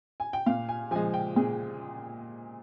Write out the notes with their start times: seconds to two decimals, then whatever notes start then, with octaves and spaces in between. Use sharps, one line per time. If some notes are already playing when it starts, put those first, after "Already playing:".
0.20 G#5
0.33 G5
0.46 A#2 F5
0.69 G#5
0.91 F3 G#3 G#5
1.14 G5
1.36 A#2 G#4